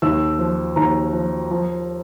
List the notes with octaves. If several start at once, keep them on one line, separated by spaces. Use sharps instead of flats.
D#2 E6
F3
D#2 A#5
F3
F3